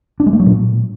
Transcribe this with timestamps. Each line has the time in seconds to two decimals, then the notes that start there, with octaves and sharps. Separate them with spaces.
0.20 D4
0.26 G#3
0.33 A3
0.40 F#3
0.46 A#2